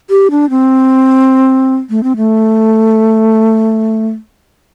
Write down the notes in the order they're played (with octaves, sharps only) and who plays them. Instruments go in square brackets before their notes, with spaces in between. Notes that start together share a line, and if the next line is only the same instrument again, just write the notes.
[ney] G4
D4
C4
A3
C4
A3